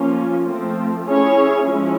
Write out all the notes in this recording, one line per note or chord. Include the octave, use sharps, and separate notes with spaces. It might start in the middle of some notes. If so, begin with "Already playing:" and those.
Already playing: F3 A#3 C#4 F4
F3 A3 C4
C#4 E4 G#4 C#5
F3 G#3 C#4 E4